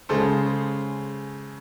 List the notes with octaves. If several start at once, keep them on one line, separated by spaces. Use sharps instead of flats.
C#3 G#3 G#4 A4 C5